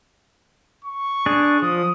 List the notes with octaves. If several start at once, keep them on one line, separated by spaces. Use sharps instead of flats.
C#6
D4 G#4
F3 D#6